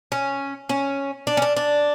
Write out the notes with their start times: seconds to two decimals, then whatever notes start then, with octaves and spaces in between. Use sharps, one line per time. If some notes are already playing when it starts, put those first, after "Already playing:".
0.12 C#4
0.69 C#4
1.27 D4
1.37 C#4
1.42 D4
1.56 D4